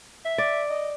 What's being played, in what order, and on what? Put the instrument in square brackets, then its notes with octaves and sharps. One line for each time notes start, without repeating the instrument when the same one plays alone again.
[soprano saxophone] E5
[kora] D5
[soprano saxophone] D#5